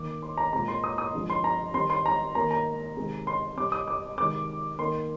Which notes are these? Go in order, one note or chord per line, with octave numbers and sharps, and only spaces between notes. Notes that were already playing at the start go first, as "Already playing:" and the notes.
Already playing: D#3 A#3 D6
C6
A#5
A#2 G#3 C4 A#5
C6
D#6
D#6
D3 F3 G#3 C4
C6
A#5
D#3 G3 C4 C6
C6
A#5
D#3 A#3 A#5
A#5
C3 D#3 G#3 C4
C6
C3 G3 C4 D6
D#6
D6
C3 D#3 G#3 D6
D#3 A#3 C6